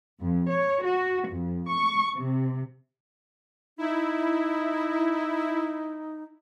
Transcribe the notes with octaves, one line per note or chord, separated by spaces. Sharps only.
F2
C#5
F#4
F2
C#6
C3
D#4 E4